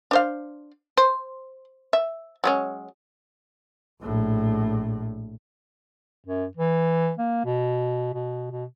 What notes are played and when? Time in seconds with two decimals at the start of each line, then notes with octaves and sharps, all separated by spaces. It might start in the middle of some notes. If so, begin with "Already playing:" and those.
0.11 D4 C5 F5
0.97 C5
1.93 E5
2.44 F#3 G#3 C#4
4.01 A#1 A2
6.26 F#2
6.57 E3
7.19 A#3
7.45 B2
8.14 B2
8.51 B2